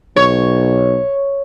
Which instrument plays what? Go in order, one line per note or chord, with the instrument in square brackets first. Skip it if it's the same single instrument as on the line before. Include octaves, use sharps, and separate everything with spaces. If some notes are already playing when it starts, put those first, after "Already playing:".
[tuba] B1 [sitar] C#5